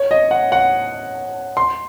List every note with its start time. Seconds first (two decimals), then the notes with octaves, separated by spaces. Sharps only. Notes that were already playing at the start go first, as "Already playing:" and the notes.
Already playing: C#5
0.11 D#5
0.31 F#5
0.52 F#5
1.57 C6